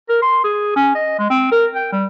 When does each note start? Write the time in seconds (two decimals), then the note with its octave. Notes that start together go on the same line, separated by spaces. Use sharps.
0.09 A#4
0.22 C6
0.44 G#4
0.76 C#4
0.95 D#5
1.19 G#3
1.30 C4
1.51 A#4
1.75 G5
1.92 G3